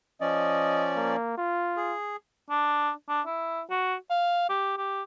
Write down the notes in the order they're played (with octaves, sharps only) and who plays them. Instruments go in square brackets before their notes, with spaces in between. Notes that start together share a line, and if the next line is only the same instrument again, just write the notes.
[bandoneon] F3 C#4 D5 [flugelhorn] D#5
[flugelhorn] A#3
F4
[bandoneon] G#4
[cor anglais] D4
D4
E4
F#4
F5
G4
G4